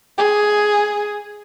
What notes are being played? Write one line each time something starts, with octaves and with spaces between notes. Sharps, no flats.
G#4